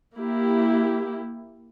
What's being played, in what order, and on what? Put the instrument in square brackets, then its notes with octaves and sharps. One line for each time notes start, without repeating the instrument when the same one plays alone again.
[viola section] A#3 E4 G4